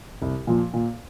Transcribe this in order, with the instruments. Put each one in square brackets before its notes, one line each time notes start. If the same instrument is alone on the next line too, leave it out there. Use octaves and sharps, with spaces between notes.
[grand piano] C2
A#2 F3
A#2